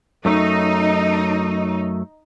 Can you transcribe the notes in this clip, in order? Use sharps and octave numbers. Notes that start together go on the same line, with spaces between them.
F#2 F#3 A3 D#4